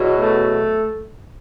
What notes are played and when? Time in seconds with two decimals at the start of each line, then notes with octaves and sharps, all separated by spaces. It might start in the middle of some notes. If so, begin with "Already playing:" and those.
Already playing: E2 B2 F#3
0.17 A3